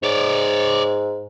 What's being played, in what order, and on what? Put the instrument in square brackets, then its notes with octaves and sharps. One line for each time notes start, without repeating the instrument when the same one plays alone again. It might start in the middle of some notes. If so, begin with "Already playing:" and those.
[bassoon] G#2 [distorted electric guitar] C#5 D5